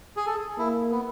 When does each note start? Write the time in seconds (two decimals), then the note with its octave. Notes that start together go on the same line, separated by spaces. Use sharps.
0.17 G#4
0.26 A4
0.58 A#3 E4
0.91 B3